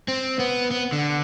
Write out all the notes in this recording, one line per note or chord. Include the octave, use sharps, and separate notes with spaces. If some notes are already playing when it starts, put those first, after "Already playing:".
C4
B3
B3
D3